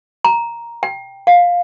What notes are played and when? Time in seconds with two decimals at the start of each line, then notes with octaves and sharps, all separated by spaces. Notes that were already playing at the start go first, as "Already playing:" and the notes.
0.25 A#5
0.83 G5
1.27 F5